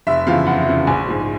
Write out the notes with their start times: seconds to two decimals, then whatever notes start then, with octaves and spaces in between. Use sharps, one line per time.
0.07 F1 E5
0.27 E2 C#3 F3 F5
0.47 F1 F#5
0.67 E2 C#3 F3
0.87 A#1 G#5
1.07 G#2 F3